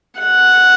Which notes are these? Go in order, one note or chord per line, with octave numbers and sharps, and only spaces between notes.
F#5